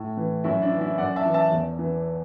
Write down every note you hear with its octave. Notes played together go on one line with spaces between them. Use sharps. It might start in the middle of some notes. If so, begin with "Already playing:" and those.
Already playing: A2
E3
F#2 E4
D4
E3
E4
F#2 D5 F#5
E5 A5
E3
E5 A5
E2
E3